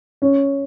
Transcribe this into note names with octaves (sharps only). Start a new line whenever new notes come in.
C#4